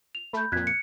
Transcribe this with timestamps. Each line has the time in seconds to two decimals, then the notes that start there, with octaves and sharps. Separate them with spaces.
0.15 F7
0.33 A3 B5 G6
0.52 F2 A#2 F#6 G#6 B6
0.67 C#7